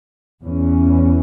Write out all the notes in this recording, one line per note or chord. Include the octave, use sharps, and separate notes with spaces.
E2 E3 C#4